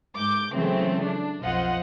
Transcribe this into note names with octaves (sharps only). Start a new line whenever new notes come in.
G#2 D6 G6
C#3 E3 F#3 G#3 A3 C4
D4
B1 F2 F4 C5 D#5 F#5